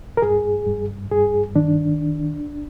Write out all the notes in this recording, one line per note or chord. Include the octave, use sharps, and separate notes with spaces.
A#4
G2 G#4
G2
G2 G#4
D#3 D4